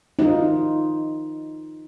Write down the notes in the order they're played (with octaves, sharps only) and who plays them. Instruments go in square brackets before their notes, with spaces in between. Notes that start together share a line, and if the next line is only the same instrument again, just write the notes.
[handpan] D#4 F4